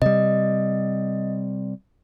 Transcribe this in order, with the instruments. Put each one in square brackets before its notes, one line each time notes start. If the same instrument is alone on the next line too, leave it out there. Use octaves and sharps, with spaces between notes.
[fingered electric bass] C3 G3 [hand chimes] D#5